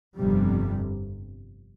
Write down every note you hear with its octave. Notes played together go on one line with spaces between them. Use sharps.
G1 F2 C3 G3